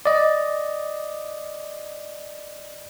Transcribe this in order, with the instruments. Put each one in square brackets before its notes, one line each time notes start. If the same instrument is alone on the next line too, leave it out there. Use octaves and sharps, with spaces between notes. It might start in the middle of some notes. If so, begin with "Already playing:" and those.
[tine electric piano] D5 D#5